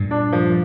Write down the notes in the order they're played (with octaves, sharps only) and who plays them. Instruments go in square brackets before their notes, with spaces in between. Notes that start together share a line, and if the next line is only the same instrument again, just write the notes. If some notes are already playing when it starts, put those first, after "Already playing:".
Already playing: [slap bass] G2 A#2
[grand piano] D4
F3